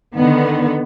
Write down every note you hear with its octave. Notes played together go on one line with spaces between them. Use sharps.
D3 D#3 B3